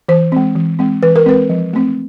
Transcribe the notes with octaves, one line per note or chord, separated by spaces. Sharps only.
E3 C5
G#3 C4
E3
G#3 C4
E3 B4
A#4
G#3 C4 B4
F3
A3 C4